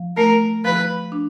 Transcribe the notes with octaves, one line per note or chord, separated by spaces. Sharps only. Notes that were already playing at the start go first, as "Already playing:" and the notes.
Already playing: F3
A3 A#4
F3 B4
D4